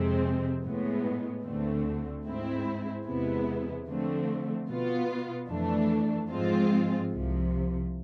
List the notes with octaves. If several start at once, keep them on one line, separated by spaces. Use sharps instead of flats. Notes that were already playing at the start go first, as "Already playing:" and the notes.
Already playing: F2 C3 G#3 C4
A2 G#3 B3
D2 D3 A3 C4
G#2 G#3 C4 E4
E2 C3 G#3 B3 E4
D3 F3 A3 C4
B2 B3 F4
F2 E3 A3 D4
G#2 F3 G#3 C4 F4
C2 C3 F3